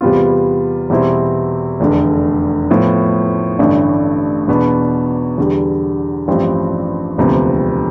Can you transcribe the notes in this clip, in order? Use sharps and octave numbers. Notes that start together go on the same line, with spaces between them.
E2 C3 G3 B3 F4
E2 B2 G3 C4 E4
F1 E2 D3
A2 F3 B3
A1 G2 D3 A3 D4
E2 B2 B3 D4
E2 D3 G3
A1 G2 F3 C4 G4
E1 D2 C3 F3 B3